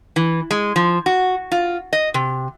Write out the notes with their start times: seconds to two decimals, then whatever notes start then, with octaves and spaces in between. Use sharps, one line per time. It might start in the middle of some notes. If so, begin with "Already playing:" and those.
0.16 E3
0.51 G#3
0.76 F3
1.06 F#4
1.52 F4
1.93 D#5
2.14 C3